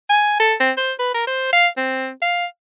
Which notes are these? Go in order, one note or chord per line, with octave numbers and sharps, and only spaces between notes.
G#5
A4
C4
C5
B4
A#4
C5
F5
C4
F5